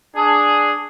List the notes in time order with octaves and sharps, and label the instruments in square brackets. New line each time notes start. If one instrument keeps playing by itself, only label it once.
[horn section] D4 G#4